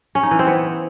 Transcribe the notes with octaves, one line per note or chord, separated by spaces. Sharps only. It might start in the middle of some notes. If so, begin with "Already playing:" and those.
C#4
D#4
E3
C4
B3